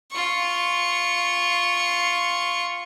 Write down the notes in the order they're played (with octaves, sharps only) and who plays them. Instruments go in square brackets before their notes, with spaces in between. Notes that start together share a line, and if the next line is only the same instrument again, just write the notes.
[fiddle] F4 C#6